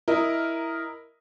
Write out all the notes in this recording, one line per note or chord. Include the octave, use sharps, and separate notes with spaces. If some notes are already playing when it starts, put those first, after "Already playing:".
E4 A#4 D#5